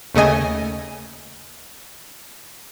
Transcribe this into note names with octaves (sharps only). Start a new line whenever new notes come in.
D#2 C#3 A3 D#5 G#5